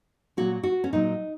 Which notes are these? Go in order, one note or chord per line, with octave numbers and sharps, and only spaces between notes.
A#2 F#3 F#4
F#4
C#4
A#2 F#3 D#4